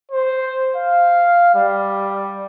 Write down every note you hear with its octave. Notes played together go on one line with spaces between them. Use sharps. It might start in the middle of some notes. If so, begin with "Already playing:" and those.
C5
F5
G3